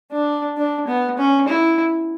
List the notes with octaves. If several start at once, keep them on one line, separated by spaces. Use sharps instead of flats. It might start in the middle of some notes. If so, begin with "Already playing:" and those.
D4
D4
B3
C#4
E4